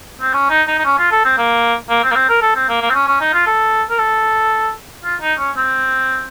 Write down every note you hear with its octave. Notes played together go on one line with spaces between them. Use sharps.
C4
C#4
D#4
D#4
D#4
C#4
F4
A4
C4
A#3
A#3
C4
A#3
C4
A#4
A4
C4
A#3
A#3
C4
C#4
C#4
D#4
F4
A4
A#4
A4
F4
D#4
C#4
C4